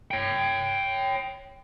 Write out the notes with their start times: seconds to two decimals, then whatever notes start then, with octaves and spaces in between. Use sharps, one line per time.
0.11 C#5 G5